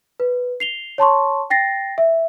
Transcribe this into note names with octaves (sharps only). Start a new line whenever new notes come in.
B4
C7 F7 G7
C#5 A5 C6 C#6
G5 A6 A#6 C7
E5